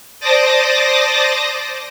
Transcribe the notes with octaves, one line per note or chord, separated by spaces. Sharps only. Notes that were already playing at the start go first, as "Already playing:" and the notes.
C5 D5 A5 D6 D#6 A#6